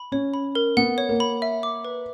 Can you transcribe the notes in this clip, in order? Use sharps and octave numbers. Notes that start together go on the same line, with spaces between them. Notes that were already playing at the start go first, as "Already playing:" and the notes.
Already playing: B5
C#4 C#5
B5
A#4
B3 F#5
C#5
A#3
B5
E5
D6
B4